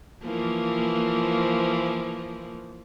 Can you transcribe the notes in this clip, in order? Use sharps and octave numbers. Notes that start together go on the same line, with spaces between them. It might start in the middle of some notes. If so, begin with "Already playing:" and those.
E3 F3 A#3